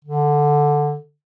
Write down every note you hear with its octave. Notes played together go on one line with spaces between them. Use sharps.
D3